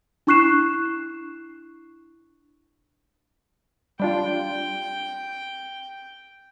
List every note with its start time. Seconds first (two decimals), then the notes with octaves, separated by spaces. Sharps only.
0.27 D4 E4 C#6 F#6 C7 E7
4.00 G3 D4 F4 G5